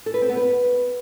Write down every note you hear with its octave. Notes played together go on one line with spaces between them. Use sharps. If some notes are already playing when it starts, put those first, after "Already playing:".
A4
B4
C4
B3
B4